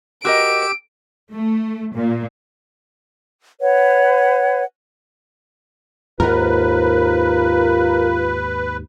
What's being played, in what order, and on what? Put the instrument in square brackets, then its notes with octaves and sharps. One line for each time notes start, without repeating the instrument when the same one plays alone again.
[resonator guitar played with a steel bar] F#4 A#4 D#5 [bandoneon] G4 E6 [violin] D7
[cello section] A3
A#2
[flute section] B4 C#5 F#5
[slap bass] D#2 G#2 [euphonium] F4 [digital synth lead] A#4 [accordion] B4